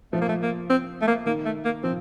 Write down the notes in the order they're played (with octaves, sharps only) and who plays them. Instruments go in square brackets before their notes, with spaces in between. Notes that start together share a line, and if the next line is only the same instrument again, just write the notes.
[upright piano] F3 [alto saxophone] A3
[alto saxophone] A#3
A3
A#3
C4
A3
A#3
[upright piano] D#3 [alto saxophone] A#3
[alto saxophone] A3
A#3
[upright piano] F3 [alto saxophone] C4